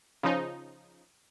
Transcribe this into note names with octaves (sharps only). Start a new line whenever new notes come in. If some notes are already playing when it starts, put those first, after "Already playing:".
C#3 F3 D#4